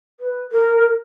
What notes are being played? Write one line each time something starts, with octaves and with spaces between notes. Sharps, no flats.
B4
A#4